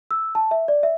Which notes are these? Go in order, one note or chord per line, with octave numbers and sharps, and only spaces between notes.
E6
A5
E5
D5
E5